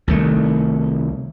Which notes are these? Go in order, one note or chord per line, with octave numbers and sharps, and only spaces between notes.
C2 D#3 A3